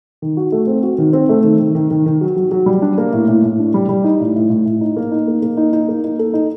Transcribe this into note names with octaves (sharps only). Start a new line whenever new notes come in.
D#3
F#4
A3
C4
F#4
D#3
C4
A3
D#3
D#3
D#3
D#3
D#3
F#3
F#3
F#3
G3
D4
A#3
A2
A2
A2
D4
G3
G3
D#4
A2
A2
A2
A2
D#4
A#3
D#4
A#3
A#3
D#4
D#4
A#3
D#4
A4
D#4